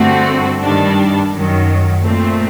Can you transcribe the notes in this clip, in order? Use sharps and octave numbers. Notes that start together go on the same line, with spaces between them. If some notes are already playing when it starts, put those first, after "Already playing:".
Already playing: G2 D3 A3 C4 F#4
G2 D#3 G3 D4
F#2 D#3 F#3
A#2 A3 C4